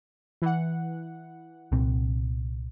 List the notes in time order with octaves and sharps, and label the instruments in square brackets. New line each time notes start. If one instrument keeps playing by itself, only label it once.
[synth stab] E3 F#5
[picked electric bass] C2 A#2 C4